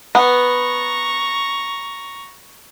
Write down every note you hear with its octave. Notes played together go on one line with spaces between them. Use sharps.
B3 A#5 C#6